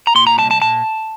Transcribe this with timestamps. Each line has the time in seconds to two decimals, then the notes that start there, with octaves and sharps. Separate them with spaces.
0.07 A#5
0.15 A#2 C6
0.27 A#5
0.38 C2 A5
0.51 A5
0.62 A#2 A5